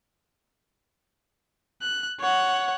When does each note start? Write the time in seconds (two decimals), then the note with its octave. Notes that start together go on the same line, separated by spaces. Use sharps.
1.82 F#6
2.20 C#5 F#5